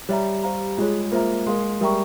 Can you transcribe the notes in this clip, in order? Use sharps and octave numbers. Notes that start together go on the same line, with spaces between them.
G3 C#5 E5 A#5
G4 C5 F5 A#5
G#3 F4 G#4 C#5
A#3 F4 C5 E5 A#5
G#3 A#4 F5 C6
G3 A#4 E5 G5 A#5 C#6